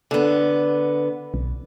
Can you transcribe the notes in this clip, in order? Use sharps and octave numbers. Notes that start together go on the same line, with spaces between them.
D3 B3
B1